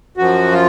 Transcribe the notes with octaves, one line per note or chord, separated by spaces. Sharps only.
F#2 F3 F#4
F4